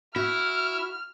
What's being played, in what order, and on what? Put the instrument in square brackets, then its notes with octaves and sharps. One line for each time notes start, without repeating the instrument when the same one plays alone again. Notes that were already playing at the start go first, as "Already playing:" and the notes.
[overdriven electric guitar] E4 [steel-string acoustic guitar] F#4 [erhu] F6